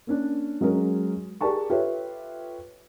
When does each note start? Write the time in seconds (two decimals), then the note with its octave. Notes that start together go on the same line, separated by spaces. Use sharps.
0.07 A#3 C#4 D4
0.61 F#3 G#3 C#4 A#4
1.41 G4 G#4 A#4 D5 A5 C#6
1.70 F4 G4 A4 B4 C#5 E5